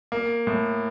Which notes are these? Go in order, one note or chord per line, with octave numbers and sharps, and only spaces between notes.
A#3
A2